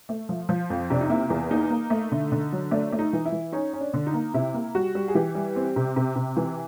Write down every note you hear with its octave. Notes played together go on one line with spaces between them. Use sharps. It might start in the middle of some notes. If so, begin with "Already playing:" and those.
A3
F3
F3
F2
C3 D4
D#4
A#3 E4
E2
A#3 D#4
A#3
A3
D3
D3
F#3
A3 D4
A3
D#4
E3
E4
E3
C#4 D#4
C#4
D4
D3
D#4
A#3
C3 E4
A#3
G3 F#4
G3
G#4
E3 G4
G3
C4
C3
C3
C3
E3